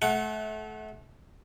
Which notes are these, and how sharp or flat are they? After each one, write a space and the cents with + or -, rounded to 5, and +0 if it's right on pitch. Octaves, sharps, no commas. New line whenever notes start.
A3 -30 F#5 +0